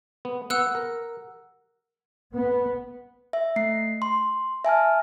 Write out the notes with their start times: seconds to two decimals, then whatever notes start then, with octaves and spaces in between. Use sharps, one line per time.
0.25 B3
0.50 B3 F#5 E6 F#6
0.75 A#4
2.35 B3
3.33 E5
3.56 A3 C7
4.02 C6
4.65 E5 G#5 A5 F6